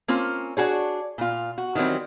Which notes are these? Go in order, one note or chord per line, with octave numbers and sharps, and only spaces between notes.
A#3 C4 C#4 F4
D4 F#4 G#4 C#5
A#2 F4
F#4
D#3 E3 F#3 G3 C4